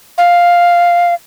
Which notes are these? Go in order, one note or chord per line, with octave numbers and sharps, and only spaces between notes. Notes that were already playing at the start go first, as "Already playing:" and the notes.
F5